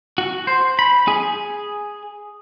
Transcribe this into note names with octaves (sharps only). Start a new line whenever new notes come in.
F#4
C5
B5
G#4